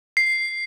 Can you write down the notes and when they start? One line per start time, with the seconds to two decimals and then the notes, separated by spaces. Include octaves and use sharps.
0.17 C7